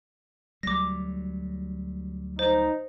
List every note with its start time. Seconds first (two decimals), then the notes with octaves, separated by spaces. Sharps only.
0.63 D2 F#3 G3 D6 A#6
2.39 D#4 C5